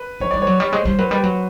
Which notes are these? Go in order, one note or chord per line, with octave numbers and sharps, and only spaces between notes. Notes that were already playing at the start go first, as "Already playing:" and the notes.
Already playing: B4
F3 C#5
G3 D5
F#3 C#5
G3
G#3 C5
G3 C5
F#3 B4
G3 B4
F#3